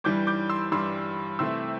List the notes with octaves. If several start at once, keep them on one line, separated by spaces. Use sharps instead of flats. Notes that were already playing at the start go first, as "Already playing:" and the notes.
G2 E3 G3 D6 G6
D6 G6
C6 E6
G2 E3 G3 C6 E6
C3 E3 A3 C6 E6